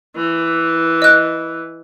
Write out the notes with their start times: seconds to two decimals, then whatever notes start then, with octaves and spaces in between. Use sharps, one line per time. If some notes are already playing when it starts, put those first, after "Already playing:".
0.16 E3
1.02 D#5 F#6